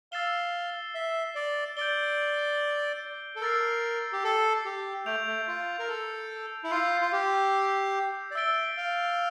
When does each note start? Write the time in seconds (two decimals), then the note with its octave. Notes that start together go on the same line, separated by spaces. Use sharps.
0.12 F5 E6 A6 C7 E7 G7
0.95 E5
1.35 D5
1.77 D5 G6 D7 G7
3.36 A4
3.41 A#4 E6 A6 C7
4.12 G4
4.24 A4
4.65 G4
5.06 A3 G6 D7 F7
5.27 A3
5.48 F4
5.79 A#4
5.88 A4
6.64 E4
6.71 F4 E6 G6 C7
7.01 F4
7.12 G4
8.31 D5
8.35 E5 E6 A6 D7 G7
8.77 F5